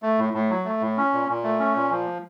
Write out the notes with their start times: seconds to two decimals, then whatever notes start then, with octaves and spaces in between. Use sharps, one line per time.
0.03 A3
0.18 A2
0.33 A2
0.50 F#3
0.65 A3
0.81 A2
0.97 C#4
1.13 A#2
1.29 A#2
1.44 A3
1.60 C#4
1.76 A#2
1.91 F3